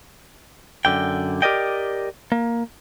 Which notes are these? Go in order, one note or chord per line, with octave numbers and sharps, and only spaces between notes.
F#2 D3 G5
G4 A#4 D5 D#5 G5
A#3